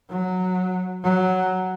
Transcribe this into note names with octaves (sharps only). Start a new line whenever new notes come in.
F#3
F#3